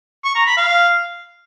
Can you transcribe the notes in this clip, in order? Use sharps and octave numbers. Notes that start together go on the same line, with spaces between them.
C#6
A#5
B5
F5